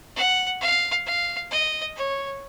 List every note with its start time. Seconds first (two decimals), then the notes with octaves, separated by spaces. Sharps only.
0.16 F#5
0.61 F5
1.06 F5
1.51 D#5
1.96 C#5